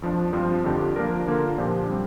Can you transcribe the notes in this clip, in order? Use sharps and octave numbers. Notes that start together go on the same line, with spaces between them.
F2 F3 D4
G2 F3 C4 F4 C5
F2 D3 F3 D4 G4
F3 A#3 D4 A#4
D3 A#3 F4 A#4
A#2 F3 D4 G4 C5
G3 C4